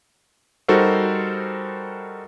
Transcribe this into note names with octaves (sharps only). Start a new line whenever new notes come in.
G3 D#4 F#4 A4 A#4 C5